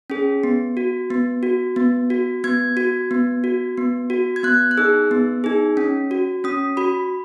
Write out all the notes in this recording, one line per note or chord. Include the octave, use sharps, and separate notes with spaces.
C#4 G#4
B3
F#4
B3
F#4
B3
F#4
B3 G#6
F#4
B3
F#4
B3
F#4
G#6
B3 F#6
F#6
D#4 G#4 E6
B3
D#4 G#4
C#4
F#4
C#4 D#6
F#4 B5